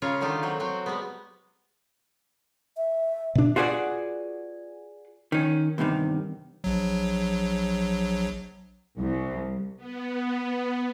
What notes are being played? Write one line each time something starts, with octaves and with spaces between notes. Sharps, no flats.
C#3 C#4 F4 G#4 A#4 C#5
D3 D#3 A3 D#4 F4 G4
E3 F#3 C4
F#3 C4 F#4
G3 G#3 B3
E5
B2 D4
F4 F#4 G#4 B4 D5 F#5
D#3 C#4
E2 G2 C3 D#3
A#1 F#3
C2
B3